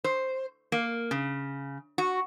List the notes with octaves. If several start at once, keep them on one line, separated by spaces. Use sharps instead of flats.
C5
A#3
C#3
F#4